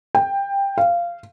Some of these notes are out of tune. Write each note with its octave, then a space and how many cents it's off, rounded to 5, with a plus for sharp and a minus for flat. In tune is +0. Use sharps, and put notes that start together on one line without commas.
G5 +15
F5 -15